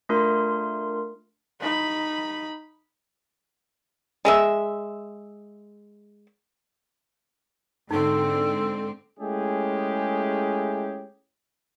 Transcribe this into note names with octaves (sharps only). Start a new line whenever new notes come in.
A3 D4 F4 A#4 C6
D#4 B5
G#3 G#4 E5
G#2 D3 C4 D#4 A4
G#3 A3 C#4 E4 G4 G#4